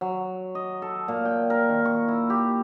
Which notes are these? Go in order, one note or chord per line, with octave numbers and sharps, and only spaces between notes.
F#3
D#5
A4
A#2
G5
A#4
D#3
C#6
E4
G4